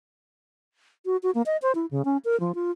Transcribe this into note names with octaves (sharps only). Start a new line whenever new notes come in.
F#4
F#4
A#3
D#5
C5
E4
C#3
C#4
A#4
F3
F4